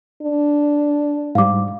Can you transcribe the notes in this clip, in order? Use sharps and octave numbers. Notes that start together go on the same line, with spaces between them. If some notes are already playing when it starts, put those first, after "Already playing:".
D4
G#2 G3 F5 D6